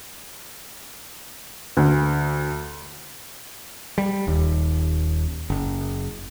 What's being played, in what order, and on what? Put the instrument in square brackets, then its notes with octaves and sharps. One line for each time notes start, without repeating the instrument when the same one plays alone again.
[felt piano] D2
[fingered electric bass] G3
D#1 D#2
F#1